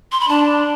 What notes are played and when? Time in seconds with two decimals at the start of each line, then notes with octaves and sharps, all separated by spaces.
0.12 C6
0.20 B5
0.28 D4 A5